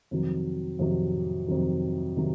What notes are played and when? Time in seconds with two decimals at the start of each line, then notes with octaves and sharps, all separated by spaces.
0.11 F2 C3 D#3 F#3
0.79 F2 C3 D#3 F#3
1.48 F2 C3 D#3 F#3
2.17 C3 D#3 F#3